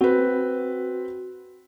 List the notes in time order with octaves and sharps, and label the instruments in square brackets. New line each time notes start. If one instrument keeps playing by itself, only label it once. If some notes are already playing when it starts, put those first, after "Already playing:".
[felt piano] C4 B4 [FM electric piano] F#4